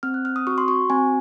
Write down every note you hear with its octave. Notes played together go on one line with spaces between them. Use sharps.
C4 F6
F#6
C4 F6
D#6
F#4 C#6
C6
F#4 C#6
C4 G#5